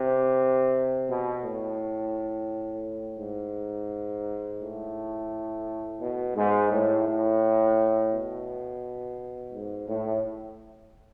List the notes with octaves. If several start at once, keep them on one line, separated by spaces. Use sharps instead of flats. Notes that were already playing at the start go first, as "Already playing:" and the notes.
Already playing: C3
B2
A2
G#2
A2
B2
G#2
A2
A2
B2
G#2
A2